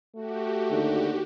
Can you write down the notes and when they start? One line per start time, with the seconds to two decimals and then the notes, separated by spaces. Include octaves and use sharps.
0.15 A3 F#4 G4
0.71 D#2 D3